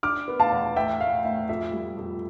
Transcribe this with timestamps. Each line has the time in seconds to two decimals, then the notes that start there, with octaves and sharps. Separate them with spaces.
0.03 D4 D6 F6
0.28 B3
0.40 F5 A5
0.52 E2
0.76 A2 E5 G5
1.00 A3 F5
1.25 A2 E5
1.49 F2 E5
1.73 G3
1.97 F2